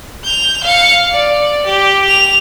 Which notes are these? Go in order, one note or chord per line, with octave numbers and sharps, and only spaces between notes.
G6 F7
F5 C#7
D5
G4
F7